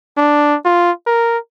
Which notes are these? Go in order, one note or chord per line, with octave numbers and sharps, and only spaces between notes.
D4
F4
A#4